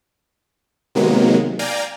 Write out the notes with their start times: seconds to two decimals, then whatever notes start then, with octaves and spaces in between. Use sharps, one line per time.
0.95 C3 D#3 F#3 G#3 A#3 B3
1.59 D5 F5 G5 G#5 A#5